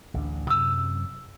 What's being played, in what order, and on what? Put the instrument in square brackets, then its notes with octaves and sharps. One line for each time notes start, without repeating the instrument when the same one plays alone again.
[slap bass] A1 D2 D4
[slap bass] F#2 C3 F#3 [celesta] E6